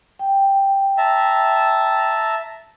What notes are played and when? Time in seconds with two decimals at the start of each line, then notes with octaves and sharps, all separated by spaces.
0.19 G5
0.98 E5 A5 A#5